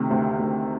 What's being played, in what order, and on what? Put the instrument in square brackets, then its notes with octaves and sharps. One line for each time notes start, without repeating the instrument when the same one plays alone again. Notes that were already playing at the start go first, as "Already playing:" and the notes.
Already playing: [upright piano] D2 C3 D#3
D2
D2